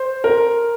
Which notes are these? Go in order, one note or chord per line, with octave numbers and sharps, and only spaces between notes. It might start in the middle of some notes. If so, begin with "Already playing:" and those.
Already playing: C5
A#4